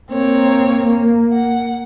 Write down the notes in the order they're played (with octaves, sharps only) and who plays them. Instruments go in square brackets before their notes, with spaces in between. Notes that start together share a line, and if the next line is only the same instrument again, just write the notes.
[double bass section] A#3 [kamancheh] C4 C#5
[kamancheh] F#5